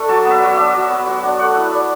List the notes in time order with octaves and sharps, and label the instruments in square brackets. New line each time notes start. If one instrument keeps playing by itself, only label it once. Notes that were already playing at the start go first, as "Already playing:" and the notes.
Already playing: [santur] A3 D4
F#3 A5
B3
E5
F#3
D4 E5
F#3
B3
F#3
D4
A3 F#5
E4 E5
E4 D5